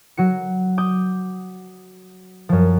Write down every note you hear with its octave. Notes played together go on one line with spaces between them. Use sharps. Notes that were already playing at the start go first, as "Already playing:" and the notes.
F#3 F#4 C#7
D6 D#6 G6
F#2 F3